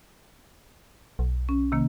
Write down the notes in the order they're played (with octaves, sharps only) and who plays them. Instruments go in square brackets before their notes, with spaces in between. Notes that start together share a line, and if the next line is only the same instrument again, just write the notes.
[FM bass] B1
[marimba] C#4
C3 D#3 A#3